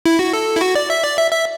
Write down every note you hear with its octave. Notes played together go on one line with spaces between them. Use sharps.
E4
F#4
A4
E4
F#4
D5
E5
D5
E5
E5